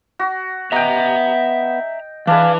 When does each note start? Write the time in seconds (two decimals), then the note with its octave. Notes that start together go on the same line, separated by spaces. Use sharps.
0.19 F#4
0.72 B3 D#5 E5 G5 A#5
2.27 E3 D4 G#4 B4 F5